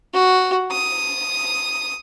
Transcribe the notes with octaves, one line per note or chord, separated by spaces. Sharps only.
F#4
D#6